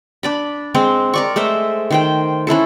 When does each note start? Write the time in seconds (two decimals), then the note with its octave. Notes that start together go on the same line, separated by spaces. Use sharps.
0.23 D4 D5 B5
0.74 G#3 C4 C5
1.14 A#4 D5 C#6
1.36 G#3 A3 C5 E5
1.91 D#3 C5 G5
2.47 C#4 E4 A4 C5